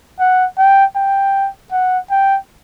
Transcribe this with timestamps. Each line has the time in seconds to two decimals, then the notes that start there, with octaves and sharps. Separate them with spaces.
0.19 F#5
0.58 G5
0.96 G5
1.72 F#5
2.11 G5